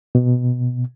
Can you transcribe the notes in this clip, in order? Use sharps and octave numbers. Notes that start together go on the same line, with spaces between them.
B2